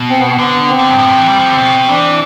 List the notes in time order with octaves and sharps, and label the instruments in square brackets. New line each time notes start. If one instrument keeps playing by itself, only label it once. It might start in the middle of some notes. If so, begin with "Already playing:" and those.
Already playing: [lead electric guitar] B2
[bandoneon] C4
B3
[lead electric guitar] D3 [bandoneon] B3
[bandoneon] C4
[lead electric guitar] D3
G2
A2
C3
E3
G3
F3
D3
B2
[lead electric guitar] E3 [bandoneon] D4